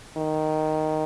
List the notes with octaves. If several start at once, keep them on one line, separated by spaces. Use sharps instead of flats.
D#3